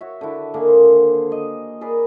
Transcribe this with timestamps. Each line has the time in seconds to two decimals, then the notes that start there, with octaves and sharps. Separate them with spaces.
0.01 F#4 C#5 E5
0.21 D3 E4
0.54 D3 D#3 A#3 G#4
0.68 C5
1.32 D#5
1.81 G#4 A#4 B4 D5